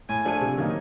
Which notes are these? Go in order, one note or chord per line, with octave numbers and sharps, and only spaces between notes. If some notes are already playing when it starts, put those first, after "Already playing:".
A2 G#5
F3 A3 D4
C3
D#3 F#3 A#3 D#4